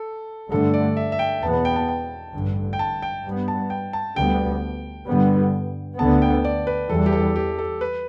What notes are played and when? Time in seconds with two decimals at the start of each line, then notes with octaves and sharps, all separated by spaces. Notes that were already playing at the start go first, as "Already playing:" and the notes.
Already playing: A4
0.51 G2 D3 A3 A4
0.74 D5
0.97 E5
1.12 E5
1.19 G5
1.43 E2 B2 B3 A5
1.53 A5
1.65 G5
1.76 A5
1.88 G5
2.33 A1 G2 D3
2.73 G5
2.79 A5
3.02 G5
3.25 G2 G3 B3
3.48 A5
3.70 G5
3.93 A5
4.16 D2 D3 G3 B3 G5
5.07 G2 D3 G3 B3
5.98 D2 D3 B3 A5
6.22 G5
6.45 D5
6.67 B4
6.90 E2 E3 G3 A4
7.06 G4
7.13 A4
7.36 G4
7.59 A4
7.81 B4